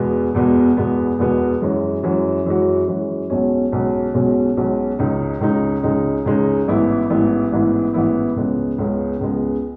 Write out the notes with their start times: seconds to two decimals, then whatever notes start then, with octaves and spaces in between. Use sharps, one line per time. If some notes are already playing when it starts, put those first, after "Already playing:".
Already playing: E2 B2 G#3 B3
0.35 E2 B2 G#3 B3
0.77 E2 B2 G#3 B3
1.18 E2 B2 G#3 B3
1.62 F#2 E3 G#3 C#4 F#4
2.03 F#2 E3 G#3 C#4 F#4
2.46 F#2 E3 G#3 C#4 F#4
2.88 F#2 E3 G#3 C#4 F#4
3.30 B1 B2 G#3 C#4
3.72 B1 B2 G#3 C#4
4.14 B1 B2 G#3 C#4
4.57 B1 B2 G#3 C#4
4.99 C#2 C#3 G#3 D#4
5.41 C#2 C#3 G#3 D#4
5.83 C#2 C#3 G#3 D#4
6.26 C#2 C#3 G#3 D#4
6.68 A1 G#2 E3 B3 E4
7.10 A1 G#2 E3 B3 E4
7.52 A1 G#2 E3 B3 E4
7.94 A1 G#2 E3 B3 E4
8.36 C#2 C#3 G#3 B3
8.78 C#2 C#3 G#3 B3
9.21 C#2 C#3 G#3 B3